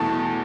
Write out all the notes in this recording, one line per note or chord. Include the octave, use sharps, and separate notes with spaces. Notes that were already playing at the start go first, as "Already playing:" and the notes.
Already playing: E2 B2 A3 A5